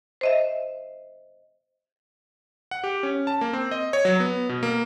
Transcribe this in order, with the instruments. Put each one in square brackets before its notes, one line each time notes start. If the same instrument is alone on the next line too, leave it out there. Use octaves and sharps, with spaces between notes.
[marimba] C5 D#5 E5
[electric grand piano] F#5
G4
C#4
A5
A#3
C4
D#5
C#5
F#3
B3
B2
A#3